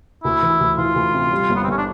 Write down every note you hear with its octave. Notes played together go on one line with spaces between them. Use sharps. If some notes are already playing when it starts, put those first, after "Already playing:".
D2 E4
E3
D2
E3 F4
D2
C3
G3
G1
B3
C4
G1 C#4
D4